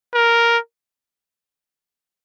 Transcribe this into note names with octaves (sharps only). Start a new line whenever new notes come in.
A#4